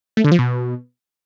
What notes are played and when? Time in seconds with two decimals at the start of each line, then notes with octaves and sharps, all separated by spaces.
0.17 A3
0.24 D3
0.32 F3
0.39 B2